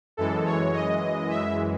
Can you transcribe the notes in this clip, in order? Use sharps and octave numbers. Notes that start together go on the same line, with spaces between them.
F#2 E3 G#3 A4
C#5
D#5
E5